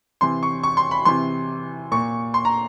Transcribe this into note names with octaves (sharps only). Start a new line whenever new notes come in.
C3 E3 C6
C#6
C#6
C6
B5
C3 E3 C6
A#2 C#6
C6
A#5